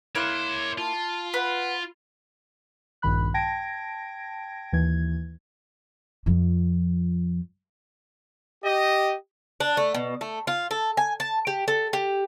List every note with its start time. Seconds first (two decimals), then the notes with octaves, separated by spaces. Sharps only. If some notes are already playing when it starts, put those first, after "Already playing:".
0.15 A#3 E4 C#5 C6 F#6
0.78 F4 A5
1.34 B4 F#5
3.02 A#1 G2 D#3 B5 F#6
3.34 G5 A5 G#6 A#6 D7
4.72 D#2 E3 G#6
6.26 F2 F3
8.64 G4 D#5
9.60 D4
9.77 A3
9.94 B2
10.21 A3
10.47 F4
10.71 A4
10.97 G#5
11.20 A5
11.47 G4
11.68 A4
11.93 G4